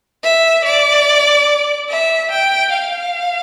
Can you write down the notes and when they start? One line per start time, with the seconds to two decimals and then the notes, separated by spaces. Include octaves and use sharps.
0.23 E5
0.64 D5
1.89 E5
2.31 G5
2.73 F5